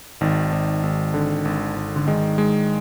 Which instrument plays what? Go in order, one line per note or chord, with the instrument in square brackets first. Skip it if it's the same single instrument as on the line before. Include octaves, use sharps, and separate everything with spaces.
[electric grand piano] G#1 [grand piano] D#3
[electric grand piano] G#1
G#1
D3
G#1
G#1
[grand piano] D3
[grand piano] D#3 [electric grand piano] G#3
[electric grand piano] G#3